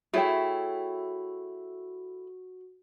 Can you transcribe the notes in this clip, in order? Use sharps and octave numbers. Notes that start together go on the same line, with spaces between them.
A3 E4 F#4 G#4 C#5 G5